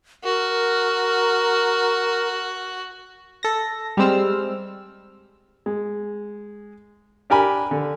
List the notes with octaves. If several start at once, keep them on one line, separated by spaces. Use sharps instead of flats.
F#4 A#4
A4 A#6
G3 G#3 C4 E6 F6
G#3
D4 G4 A#4 G#5 B5
D3